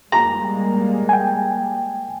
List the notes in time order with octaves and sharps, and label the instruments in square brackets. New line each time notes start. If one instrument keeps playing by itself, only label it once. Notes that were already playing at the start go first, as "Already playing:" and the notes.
[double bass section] G3 G#3 A#3 [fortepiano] A#5
[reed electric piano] G5 G#5